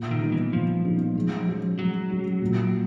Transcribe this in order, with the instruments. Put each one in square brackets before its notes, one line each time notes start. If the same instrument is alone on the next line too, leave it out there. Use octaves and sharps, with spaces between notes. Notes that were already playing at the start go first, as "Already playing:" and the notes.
Already playing: [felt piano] A#2
[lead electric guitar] D#3
[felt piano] G3 B3 D#4
[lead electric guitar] E3
[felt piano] A#2 [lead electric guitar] F3
[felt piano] G3 B3 D#4
G#3
C#4 F#4
[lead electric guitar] F#3 [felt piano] G#3
[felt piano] C#4 F#4
A#2